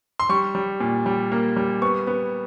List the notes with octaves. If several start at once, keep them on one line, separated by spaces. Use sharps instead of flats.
C6
G3 C#6
G3
A#2
G3
A#3
G3
B3 C#6
B3